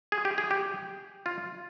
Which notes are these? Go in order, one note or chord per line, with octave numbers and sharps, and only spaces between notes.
G#4
G4
G#4
G4
F4